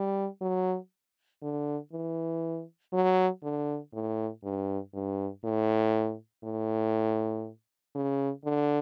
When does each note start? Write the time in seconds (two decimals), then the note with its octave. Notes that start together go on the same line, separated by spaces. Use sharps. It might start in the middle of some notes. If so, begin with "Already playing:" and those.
Already playing: G3
0.41 F#3
1.42 D3
1.92 E3
2.93 F#3
3.43 D3
3.93 A2
4.43 G2
4.93 G2
5.44 A2
6.44 A2
7.95 C#3
8.45 D3